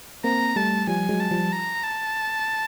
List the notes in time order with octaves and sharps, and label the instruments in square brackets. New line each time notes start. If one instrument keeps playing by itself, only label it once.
[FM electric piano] A#3 C4 [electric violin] A#5
[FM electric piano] G3 A3 [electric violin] A5
[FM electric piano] F3 G3 [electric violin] G#5
[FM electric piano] F#3 G#3
[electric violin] A5
[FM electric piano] F3 G3
[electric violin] A#5
A5